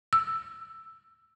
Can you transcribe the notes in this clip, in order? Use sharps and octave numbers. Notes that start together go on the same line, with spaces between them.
E6